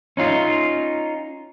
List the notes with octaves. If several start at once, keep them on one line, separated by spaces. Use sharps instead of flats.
C#4 D#4 F4